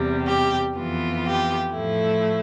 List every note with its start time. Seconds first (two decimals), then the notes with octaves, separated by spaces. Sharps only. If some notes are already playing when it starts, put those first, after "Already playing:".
Already playing: E2 C3 G3
0.26 G4
0.76 F2 E3 B3 F4
1.25 G4
1.74 A2 F3 A3 E4